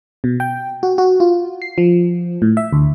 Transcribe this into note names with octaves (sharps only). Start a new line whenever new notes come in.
B2
G5
F#4
F#4
F4
C7
F3
A2
E5
D2